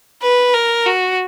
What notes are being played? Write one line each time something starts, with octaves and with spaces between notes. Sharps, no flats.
B4
A#4
F#4